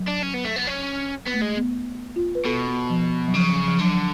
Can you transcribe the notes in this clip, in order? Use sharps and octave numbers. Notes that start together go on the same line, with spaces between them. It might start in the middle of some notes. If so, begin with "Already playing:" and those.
Already playing: F#3
D4
C#4
B3
A3
B3
C#4
B3
A3
G#3
B3
F4
B4
B2 A4
B3
F3
F#3
C#3 F3
F3
D3 F#3